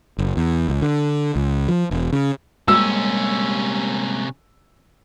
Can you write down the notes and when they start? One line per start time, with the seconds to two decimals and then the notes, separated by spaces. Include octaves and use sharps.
0.18 F#1
0.37 E2
0.69 C#2
0.82 D3
1.36 C#2
1.68 F3
1.91 E1
2.13 C#3
2.68 C3 G3 G#3 A#3 C#4 E6